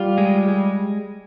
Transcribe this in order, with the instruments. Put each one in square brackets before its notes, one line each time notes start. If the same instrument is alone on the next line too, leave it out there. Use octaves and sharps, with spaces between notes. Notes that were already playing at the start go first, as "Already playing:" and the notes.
Already playing: [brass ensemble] G3 [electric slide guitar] F4
[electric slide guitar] G#3
G#3